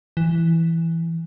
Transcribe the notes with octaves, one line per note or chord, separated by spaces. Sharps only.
E3